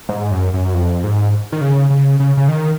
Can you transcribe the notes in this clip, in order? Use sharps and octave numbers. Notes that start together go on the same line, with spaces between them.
G#2
F#2
F#2
F2
G#2
D#3
C#3
C#3
C#3
C#3
D#3